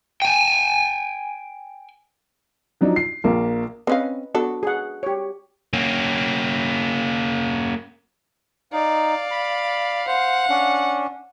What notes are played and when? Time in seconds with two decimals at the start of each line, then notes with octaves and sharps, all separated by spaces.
0.22 G5 G#5
2.81 F3 F#3 D4 D#4
2.96 C7
3.24 A#1 A#3
3.87 C4 C#4 B4 D#5 F5
4.35 B3 D4 F#4 A4
4.63 G#4 F#5
5.03 G4 C#5
5.74 A#3 C#4
8.73 D#4 D5 F5
9.31 B5
10.07 C5 F#5
10.50 C#4 D4